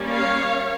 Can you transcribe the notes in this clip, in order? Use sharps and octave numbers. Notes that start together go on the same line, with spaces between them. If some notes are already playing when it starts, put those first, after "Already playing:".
Already playing: G3 A#3 C#4
C#5 F5